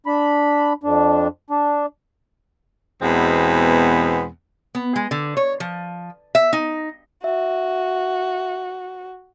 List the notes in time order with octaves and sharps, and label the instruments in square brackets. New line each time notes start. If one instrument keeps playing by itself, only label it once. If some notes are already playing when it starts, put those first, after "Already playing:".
[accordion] D4 B5
F2 D4
D4
[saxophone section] E2 B2 G#3 B3 C4
[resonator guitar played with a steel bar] B3
G#3
D3
C#5
F3
E5
D#4
[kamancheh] F#4 [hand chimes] E5